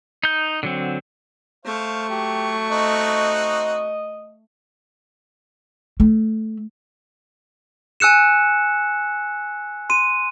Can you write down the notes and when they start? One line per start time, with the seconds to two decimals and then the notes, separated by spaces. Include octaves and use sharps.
0.23 D#4 G6
0.63 D3 F#3 C4
1.65 A3 C5 F5 C#6
2.10 F#3 G4
2.70 C4 D#4 F#4 D#5
6.00 A3
8.00 G#5 E6 F#6 C#7 E7
9.90 C6 D#7